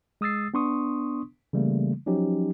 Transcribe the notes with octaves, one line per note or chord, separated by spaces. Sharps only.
G#3 D#6 E6 A6 C7
B3 D4 C6 C#6 D#6
C#3 E3 G3 A3 A#3
F3 F#3 C#4 D#4 G4